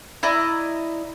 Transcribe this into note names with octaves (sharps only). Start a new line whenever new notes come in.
E4 D5 D#5 A#5